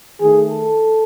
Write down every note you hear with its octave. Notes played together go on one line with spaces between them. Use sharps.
D#3 A3 G#4
A4